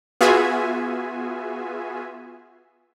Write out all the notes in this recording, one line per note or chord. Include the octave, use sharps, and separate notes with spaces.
B3 F4 F#4 G#4 E5 G#5